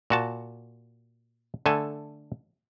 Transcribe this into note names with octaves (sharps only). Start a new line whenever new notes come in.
A#2 F#4 A5
D3 A3 A4 G#5